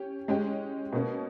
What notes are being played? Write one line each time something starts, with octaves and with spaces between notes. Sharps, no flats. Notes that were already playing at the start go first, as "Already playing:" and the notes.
Already playing: C#4 G4
G#3 C#4 G4
B2 A#3 C#4